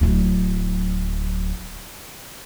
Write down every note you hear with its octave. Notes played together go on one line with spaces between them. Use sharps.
D1 F#3